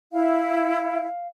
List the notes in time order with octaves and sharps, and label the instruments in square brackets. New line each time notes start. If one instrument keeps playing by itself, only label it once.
[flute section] E4 [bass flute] F5